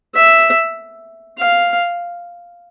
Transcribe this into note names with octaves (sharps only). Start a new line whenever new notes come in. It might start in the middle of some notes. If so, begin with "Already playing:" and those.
E5
F5